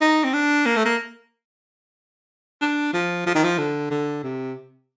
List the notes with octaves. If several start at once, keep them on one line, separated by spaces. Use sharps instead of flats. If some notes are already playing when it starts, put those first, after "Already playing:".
D#4
C4
D4
A#3
A3
A#3
D4
F3
F3
D#3
F3
D3
D3
C3